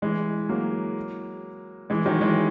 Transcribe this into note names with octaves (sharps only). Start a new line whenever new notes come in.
E3 G#3
F#3 A#3
E3 G#3
D#3 F#3
E3 G#3